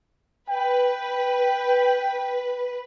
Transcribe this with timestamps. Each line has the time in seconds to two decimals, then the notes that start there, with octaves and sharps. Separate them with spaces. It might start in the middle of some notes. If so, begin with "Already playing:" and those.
0.49 B4 G5